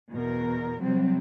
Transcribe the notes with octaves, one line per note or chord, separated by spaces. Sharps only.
E2 B2 A#4
C3 F#3 G3 C4